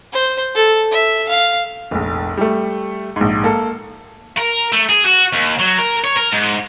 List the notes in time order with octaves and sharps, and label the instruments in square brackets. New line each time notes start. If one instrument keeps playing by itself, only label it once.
[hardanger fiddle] C5
A4
E5
F5
[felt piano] F1 A#1
G3 A3
A#1 G#2
A#3 A4
[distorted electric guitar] A#4
A3
G#4
F#4
D#2
F#3
A#4
C#5
A#4
G#2